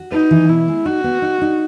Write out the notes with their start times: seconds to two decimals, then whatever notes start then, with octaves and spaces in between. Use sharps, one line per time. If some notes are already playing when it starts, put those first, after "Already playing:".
Already playing: F#4
0.12 D#4 B4
0.31 E3
0.49 B2 E4
0.68 G#3
0.86 D#4 F#4
1.04 B3
1.22 D#4
1.41 D#4